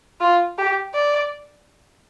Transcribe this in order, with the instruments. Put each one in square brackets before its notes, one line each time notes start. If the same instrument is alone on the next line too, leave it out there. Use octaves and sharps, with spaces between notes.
[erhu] F4
G4
D5